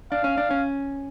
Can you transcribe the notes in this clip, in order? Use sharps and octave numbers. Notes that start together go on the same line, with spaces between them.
D4 F5
C#4
D4
C#4